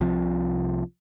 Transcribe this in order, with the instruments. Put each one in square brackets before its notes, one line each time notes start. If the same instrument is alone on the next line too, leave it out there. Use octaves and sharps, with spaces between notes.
[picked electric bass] C2 C3 F3